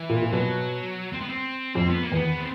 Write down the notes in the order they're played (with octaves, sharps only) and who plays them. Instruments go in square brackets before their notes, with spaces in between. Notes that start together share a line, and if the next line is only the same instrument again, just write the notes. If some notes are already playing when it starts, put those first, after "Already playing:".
Already playing: [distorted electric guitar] E3
[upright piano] A#2
A#2
[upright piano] B2 [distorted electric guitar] F#3
[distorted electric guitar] C4
B3
C4
[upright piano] F2 [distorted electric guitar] C4
[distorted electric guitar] B3
A#3
[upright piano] E2 [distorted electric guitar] B3
[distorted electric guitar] C4